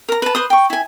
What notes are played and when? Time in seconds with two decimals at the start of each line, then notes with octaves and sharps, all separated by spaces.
0.09 A#4 A#5
0.22 B4 A5
0.35 B4 C5 D#6
0.50 G5 C#6
0.70 E4 G#5